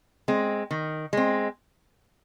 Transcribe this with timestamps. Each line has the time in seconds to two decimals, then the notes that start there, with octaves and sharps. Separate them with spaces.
0.28 G#3 C4
0.71 D#3
1.13 G#3 C4